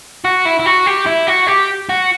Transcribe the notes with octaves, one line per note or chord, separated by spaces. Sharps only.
F#4
E4
E4
F#4
G4
E4
F#4
G4
F#4